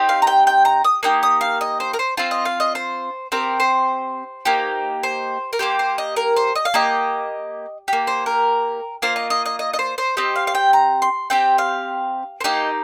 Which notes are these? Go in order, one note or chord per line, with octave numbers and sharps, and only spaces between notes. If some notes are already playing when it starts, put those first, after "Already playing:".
Already playing: C4 D#4 G4
F5
A#5
G5
G5
A#5
D#6
A#3 D#4 G4 D#6
D#6
F5
D#5
C5
A#4
C5
C4 F4 C5
D#5
F5
D#5
C5
C4 G4 A#4
C5
A#3 D#4 G4
C5
A#4
A#3 G4 C5
C5
D#5
A#4
C5
D#5
F5
A#3 G4 D#5
A#3 G4
C5
A#4
A#3 F4 C5
D#5
D#5
D#5
D#5
D#5
C5
C5
C4 G4 D#5
F5
F5
G5
A#5
C6
C4 G4 G5
F5
C5
A#3 D#4 G4 D#5